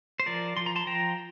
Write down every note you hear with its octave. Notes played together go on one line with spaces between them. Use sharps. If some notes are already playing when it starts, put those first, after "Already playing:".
C5
F3 A#4 D5
F3 C6
A#5
A5 C6
F3 G5 A#5